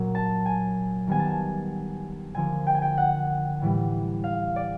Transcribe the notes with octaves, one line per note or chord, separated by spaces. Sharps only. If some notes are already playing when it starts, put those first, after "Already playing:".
Already playing: A#2 F#3 A#3
A5
G#5
D#3 G3 B3 G#5
A5
G#5
D3 F3 A#3 G#5
G5
G#5
G5
F#5
A2 E3 G3
F5
D5